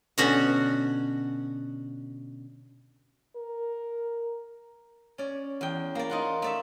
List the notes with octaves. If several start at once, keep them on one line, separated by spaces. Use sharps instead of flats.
B2 D3 C#4 F#4 F#5
A#4
C#4 D5
E2 G5
A#3 D5
D#4 F4 F#5
A3 D5 E5